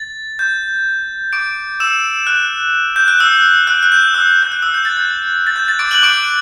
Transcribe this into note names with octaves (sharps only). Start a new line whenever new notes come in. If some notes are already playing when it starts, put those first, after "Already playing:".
Already playing: A6
G6
D6 D7
E6 E7
F#6
G6
F#6
E6
F#6
F#6
G6
E6
G6
F#6
E6
G6
A6
G6
A6
G6
A6
D6 D7
F#6 F#7
D6 D7